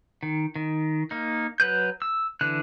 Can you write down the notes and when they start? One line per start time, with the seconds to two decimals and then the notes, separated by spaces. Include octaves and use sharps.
0.23 D#3
0.56 D#3
1.11 A#3 D#4
1.60 F#3 B4 G6
2.02 E6
2.41 D3 E3 F#6